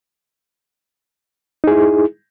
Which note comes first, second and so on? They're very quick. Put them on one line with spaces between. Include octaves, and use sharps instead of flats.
D#4 G#4 E4